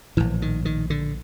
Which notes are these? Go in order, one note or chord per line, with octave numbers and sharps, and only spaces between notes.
A#1 A2 E3
D#3
D#3
D3